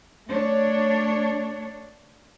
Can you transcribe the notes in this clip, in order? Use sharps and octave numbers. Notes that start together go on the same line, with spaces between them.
A3 D4 C#5